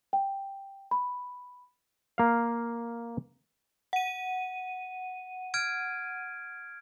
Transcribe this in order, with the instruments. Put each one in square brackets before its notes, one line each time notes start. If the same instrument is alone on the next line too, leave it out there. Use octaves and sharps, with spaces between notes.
[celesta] G5
B5
[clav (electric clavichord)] A#3 F5
[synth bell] F#5 D#7
[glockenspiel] F6 G#6 D7